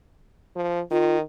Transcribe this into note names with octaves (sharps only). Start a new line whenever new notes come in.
F3
D#3 F4